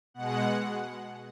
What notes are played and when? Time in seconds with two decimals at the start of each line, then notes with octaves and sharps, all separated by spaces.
0.14 B2 G#3 F#5